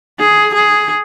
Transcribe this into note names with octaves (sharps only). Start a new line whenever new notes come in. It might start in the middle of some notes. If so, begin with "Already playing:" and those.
G#4
G#4